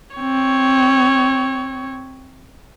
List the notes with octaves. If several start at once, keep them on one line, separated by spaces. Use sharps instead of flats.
C4 C#5